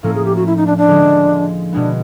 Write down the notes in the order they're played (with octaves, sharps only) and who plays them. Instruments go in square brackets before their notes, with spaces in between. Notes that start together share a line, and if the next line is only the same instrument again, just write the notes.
[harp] A2 F3 A#3 C#4 [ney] A4
[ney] G#4
G4
F#4
E4
D#4
D4
D4
[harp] D3 F3 G#3
[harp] B2 G#3 B3 [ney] D4